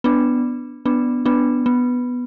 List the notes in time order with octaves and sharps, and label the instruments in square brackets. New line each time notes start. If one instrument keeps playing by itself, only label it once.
[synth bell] B3 D4
B3 D4
B3 D4
B3